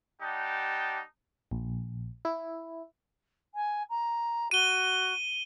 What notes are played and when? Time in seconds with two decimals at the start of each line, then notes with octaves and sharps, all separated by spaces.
0.21 G3 D#4 G4 F#5 A5
1.51 A#1
2.25 E4
3.54 G#5
3.89 A#5
4.51 F#4 D#7 G7